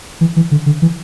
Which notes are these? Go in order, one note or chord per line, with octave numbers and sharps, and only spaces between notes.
E3
E3
D3
D3
E3